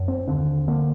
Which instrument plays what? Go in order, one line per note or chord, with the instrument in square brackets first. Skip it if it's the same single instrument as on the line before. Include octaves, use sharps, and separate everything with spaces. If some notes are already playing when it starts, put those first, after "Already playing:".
Already playing: [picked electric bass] F#2
C4
D#2 D3 C4
D3 A#3